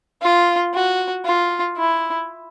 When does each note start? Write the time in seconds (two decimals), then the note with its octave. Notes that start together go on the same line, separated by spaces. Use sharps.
0.22 F4
0.74 F#4
1.25 F4
1.77 E4